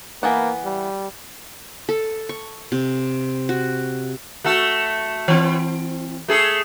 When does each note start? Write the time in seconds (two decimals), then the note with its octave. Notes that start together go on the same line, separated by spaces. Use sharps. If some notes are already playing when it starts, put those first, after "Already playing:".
0.23 E3 A#3 B3 F#5
0.64 G3
1.89 A4
2.29 C#6
2.72 C3
3.49 F#4
4.44 A3 F#4 A4
5.28 E3 C4
6.28 A3 G#4 A4